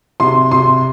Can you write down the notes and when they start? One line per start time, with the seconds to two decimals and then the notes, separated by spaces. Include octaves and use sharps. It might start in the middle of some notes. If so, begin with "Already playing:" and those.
0.20 C3 C6
0.51 C3 C6